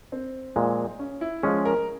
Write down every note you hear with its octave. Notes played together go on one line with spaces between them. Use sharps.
C4
A#2 F3 G#3
C#4
E4
F3 G#3 C#4 G#4
A#4